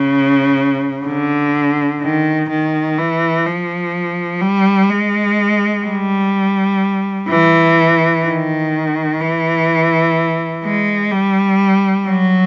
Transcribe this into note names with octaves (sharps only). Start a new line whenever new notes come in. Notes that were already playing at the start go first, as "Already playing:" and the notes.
Already playing: C#3
D3
D#3
D#3
E3
F3
G3
G#3
G3
E3
D#3
E3
G#3
G3
F#3